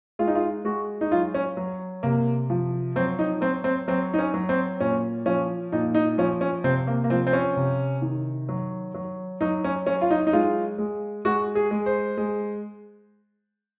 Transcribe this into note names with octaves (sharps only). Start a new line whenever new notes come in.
G#3 F4
D#4
F4
G#3 F#4
D#4
F#3 F4
C#4
F#3
C3 A#3
F3
F#3 C4
D#4
F#3 C4
C4
F#3 C4
D#4
C#4
F#3
C4
A#2 C#4
F3 C#4
A#2 D#4
D#4
F3 C#4
C#4
C3 C4
A#3
A#3
F3 C4
C4
C#4
C3
D#3
F#3
F#3
F#3 D#4
C#4
F#3 C#4
F4
D#4
D#4
G#3 F4
G#3
G#3 F#4
G#4
G#3
C5
G#3